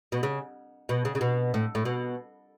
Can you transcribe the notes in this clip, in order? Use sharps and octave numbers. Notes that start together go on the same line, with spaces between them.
B2
C#3
B2
C#3
C#3
B2
A2
A2
B2